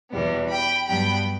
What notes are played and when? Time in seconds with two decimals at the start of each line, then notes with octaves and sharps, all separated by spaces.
0.11 E2 B2 G3 B3
0.49 G5 B5
0.87 G2 F#3 B3 G5 B5